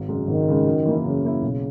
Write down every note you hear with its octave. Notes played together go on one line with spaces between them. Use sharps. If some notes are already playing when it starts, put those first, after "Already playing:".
Already playing: G#1
F#2 C#3 G#3
G#1 D#3
F#2 C#3 G#3
F#2
E3 A#3 E4
F#2 C#3
E3 A#3 E4
B1